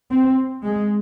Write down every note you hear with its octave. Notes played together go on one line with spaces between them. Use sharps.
C4
G#3